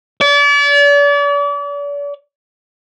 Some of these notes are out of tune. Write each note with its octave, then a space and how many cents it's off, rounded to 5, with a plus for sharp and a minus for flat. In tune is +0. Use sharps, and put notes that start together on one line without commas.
D5 -40